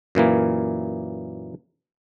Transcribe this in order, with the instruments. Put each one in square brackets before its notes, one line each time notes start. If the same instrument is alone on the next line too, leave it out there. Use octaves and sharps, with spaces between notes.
[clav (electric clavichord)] F#2 A#2 E3 A#3